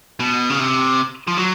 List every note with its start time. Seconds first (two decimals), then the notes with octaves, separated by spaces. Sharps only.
0.20 B2
0.50 C#3
0.59 C3
1.28 F3
1.37 F#3